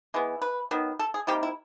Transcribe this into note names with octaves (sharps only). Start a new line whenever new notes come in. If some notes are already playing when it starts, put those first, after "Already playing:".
E3 G#3 B3
B4
D#3 F#3 B3
A4
G#4
C3 D#3 G3 A#3 G4
E4